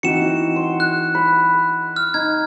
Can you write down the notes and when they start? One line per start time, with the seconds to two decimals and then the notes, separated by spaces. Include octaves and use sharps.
0.03 E3 C4 D#4 F#4 C#7 E7
0.56 C6
0.80 F#6
1.15 B5
1.96 F6
2.14 D#4 G#6